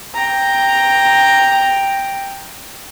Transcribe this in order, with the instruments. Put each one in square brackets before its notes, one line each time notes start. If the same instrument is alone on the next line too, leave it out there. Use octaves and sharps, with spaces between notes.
[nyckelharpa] G5 A#5